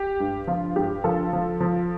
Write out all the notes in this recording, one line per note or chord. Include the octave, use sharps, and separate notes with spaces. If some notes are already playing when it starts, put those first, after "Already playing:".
Already playing: G4
G2
F3 F4
G2 G4
F3 F4 A4
F3
F3